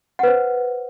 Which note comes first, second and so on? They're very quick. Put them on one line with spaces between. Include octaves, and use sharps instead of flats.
F#5 B4 C5